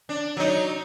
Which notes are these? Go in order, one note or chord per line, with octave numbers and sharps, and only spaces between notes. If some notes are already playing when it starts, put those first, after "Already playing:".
D4
F#3 D#4